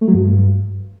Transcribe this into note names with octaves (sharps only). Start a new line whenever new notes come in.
A3
F#3
G2